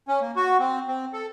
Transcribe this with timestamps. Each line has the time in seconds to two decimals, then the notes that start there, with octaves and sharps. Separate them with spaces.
0.08 C#4
0.21 A#3
0.36 F#4
0.59 C4
0.88 C4
1.13 A4